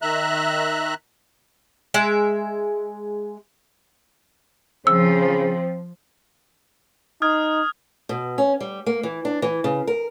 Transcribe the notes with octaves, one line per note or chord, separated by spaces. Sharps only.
D#3 E5 A#5 F#6
G#3 E5
C#3 F3 C4 E6
D#4 D#6 F6 G#6
B2
C#4
G3
A#3
E3
D4
E3
C#3
A#4